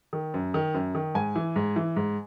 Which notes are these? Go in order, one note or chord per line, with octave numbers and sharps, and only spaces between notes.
D#3
F#2
D#3
F#2
D#3
G#2 G#5
E3
G#2
E3
G#2